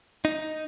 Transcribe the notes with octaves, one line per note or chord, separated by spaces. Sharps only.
D#4